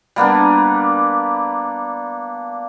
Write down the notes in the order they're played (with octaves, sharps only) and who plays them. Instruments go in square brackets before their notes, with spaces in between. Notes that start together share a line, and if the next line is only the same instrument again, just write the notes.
[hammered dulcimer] G3 A#3 B3 D4